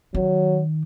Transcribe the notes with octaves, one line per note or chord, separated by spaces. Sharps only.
D#3 F#3